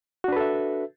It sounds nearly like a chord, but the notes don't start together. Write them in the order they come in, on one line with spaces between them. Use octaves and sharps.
F#4 D4 B4 A4 E5